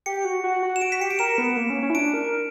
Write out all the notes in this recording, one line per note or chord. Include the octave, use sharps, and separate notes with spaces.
G4 C#7
F#4
F#4
F#4
E7
F#4 D7
B6
G4 C#7
D7
A#4 E7
B3
A#3
C#4
C#4
E4
D4 D7
A#4